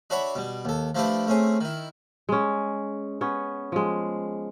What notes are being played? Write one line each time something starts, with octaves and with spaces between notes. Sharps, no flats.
D4 F#4 C#5 E5 F#5 B5
B2 G3
D#2 A4
F3 A3 D4 E4 G4 B4
A3 C4 C#4 G#4
D#3 E4
G#3 C#4
B3 C#4
F3 G#3